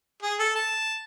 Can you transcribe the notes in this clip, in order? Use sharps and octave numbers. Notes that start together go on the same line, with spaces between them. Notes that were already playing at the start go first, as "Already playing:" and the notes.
G#4
A4
A5